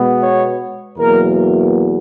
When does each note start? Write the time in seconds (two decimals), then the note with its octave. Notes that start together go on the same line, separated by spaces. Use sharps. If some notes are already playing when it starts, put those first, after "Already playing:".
Already playing: B2 G#3 B3
0.22 C#5
0.98 E2 B2 F#3 A#3 A#4